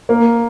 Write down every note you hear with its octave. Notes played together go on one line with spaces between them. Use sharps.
A#3